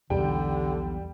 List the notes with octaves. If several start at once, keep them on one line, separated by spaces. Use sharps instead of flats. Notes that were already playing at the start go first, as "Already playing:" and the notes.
B1 E2 B2 D3 G3 G5